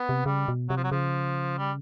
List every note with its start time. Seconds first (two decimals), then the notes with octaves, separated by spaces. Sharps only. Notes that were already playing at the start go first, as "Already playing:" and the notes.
Already playing: B3
0.09 C3
0.26 C#3 G3
0.48 B2
0.69 C3 F#3
0.77 F3
0.84 F#3
0.91 C#3 F3
1.59 G3